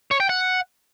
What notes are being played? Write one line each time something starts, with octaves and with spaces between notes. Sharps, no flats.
C#5
G5
F#5